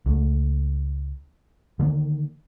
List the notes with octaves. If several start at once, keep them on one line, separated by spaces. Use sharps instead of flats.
C#2 A3
D3 D#3 A#3